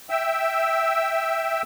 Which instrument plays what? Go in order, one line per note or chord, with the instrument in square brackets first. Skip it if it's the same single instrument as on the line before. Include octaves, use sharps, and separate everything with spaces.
[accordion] E5 G5 E6